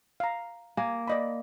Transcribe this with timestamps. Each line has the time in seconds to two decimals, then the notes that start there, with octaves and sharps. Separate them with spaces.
0.20 F5 A#5
0.77 A#3 G#5
1.08 D5 D#5 B5